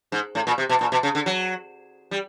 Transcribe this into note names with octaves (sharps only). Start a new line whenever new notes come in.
G#2
A2
A#2
C3
B2
A#2
B2
C#3
D3
F#3
G3